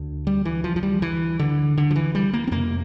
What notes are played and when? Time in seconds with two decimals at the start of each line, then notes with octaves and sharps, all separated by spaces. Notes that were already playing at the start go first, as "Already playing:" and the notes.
Already playing: D2 D3
0.27 G3
0.45 E3
0.64 F3
0.76 F3
0.83 G3
1.02 E3
1.39 D3
1.77 D3
1.91 F3
1.96 E3
2.15 G3
2.33 A#3
2.47 C4
2.51 F2 C3 A#3